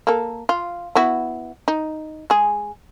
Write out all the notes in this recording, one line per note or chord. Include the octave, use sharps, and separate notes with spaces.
A#3 A4
F4
B3 E4 F#4
D#4
G#3 G#4